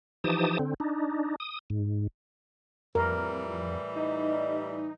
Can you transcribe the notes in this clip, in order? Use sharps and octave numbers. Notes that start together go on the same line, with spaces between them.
E3 F3 D#4 G4 A5 D#6
D3 C4
D4 D#4
D#6
G#2
F2 A2 E3 G3 A#4
D#4 D#5